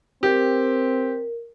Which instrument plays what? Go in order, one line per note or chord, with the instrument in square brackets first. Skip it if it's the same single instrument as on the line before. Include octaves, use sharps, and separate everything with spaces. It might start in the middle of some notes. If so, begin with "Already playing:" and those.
[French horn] C4 [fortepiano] G4 [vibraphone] A#4